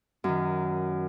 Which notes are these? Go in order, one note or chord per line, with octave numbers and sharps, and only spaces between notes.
F#2 D#3